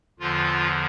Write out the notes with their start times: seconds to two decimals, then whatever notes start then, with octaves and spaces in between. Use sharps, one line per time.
0.19 E2 D3 F3 F4